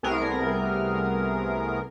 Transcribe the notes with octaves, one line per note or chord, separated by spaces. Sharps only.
C2 C3 A3 B3 G#4 A#4